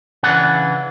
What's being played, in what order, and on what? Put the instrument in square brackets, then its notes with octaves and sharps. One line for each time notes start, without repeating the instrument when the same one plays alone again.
[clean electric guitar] C#3 E3 D4 F#5